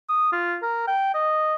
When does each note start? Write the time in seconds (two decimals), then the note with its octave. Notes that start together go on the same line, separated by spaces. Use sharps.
0.09 D#6
0.32 F4
0.62 A#4
0.88 G5
1.14 D#5